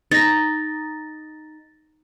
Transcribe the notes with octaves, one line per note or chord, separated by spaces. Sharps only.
D#4 A6 A#6